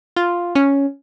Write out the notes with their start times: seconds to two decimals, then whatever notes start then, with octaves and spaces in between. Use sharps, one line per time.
0.16 F4
0.55 C#4